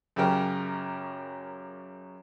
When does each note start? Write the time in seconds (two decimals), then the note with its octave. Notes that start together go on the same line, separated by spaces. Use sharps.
0.16 F#2 C#3 G4 A#4